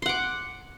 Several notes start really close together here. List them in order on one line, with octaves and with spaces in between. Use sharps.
C6 F#5 D6